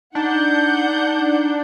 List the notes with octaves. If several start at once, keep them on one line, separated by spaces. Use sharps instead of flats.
D4 D#4 F#5 G6